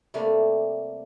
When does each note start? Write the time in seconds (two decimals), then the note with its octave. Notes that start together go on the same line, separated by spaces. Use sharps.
0.14 C3 G3 A3 A#3